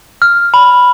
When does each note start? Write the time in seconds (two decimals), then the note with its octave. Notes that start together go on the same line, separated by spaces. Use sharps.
0.22 F6
0.54 B5